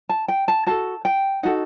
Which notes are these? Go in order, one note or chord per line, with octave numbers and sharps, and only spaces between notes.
A5
G5
A5
F#4 A4 A5
G5
D#4 F#4 A4 F#5